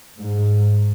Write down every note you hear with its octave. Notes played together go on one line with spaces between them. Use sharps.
G#2